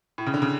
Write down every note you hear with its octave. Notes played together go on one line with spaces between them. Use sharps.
A2
C#3
D3
C#3